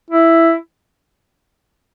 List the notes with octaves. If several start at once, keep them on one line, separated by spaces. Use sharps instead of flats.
E4